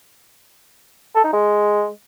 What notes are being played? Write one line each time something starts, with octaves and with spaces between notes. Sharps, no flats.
A4
D#4
G#3